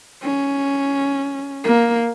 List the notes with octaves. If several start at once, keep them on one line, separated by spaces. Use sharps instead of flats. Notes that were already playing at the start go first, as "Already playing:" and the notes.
C#4
A#3